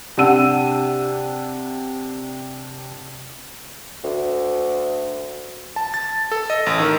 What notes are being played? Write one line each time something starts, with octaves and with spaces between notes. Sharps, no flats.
C3 D4 F#5 E6 D#7
D2
A5
A6
A4
D#5
A1
D#3